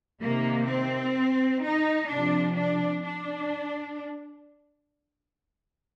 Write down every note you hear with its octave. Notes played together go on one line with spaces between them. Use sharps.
C3 D#3 A#3
C4
D#4
C3 F3 D4
D4
D4